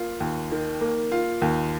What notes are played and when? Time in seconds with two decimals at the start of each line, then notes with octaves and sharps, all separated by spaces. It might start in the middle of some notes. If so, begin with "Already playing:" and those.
Already playing: A#3 F4
0.20 D#2
0.51 D#3
0.81 A#3
1.12 F4
1.42 D#2